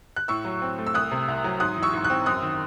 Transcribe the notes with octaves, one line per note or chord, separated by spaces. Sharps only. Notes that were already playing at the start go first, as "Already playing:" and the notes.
F#6
A2 C#6 E6
F#3
C4
A3
E6
C2 D#6 F#6
C3
C2
F#3
G#2 D#6 F#6
E3
C#6 E6
G#2
F#6
C4
F#2 D#6 F#6
D#3